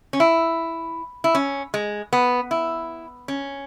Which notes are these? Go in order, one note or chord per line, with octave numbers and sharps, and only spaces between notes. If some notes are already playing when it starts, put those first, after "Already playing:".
C#4
E4
E4
C#4
G#3
B3
E4
C#4